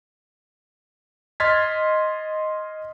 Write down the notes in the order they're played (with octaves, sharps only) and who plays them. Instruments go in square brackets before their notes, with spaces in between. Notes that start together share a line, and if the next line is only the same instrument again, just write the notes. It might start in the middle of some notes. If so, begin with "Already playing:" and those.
[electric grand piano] D#5 C6 F6 G#6 A6 B6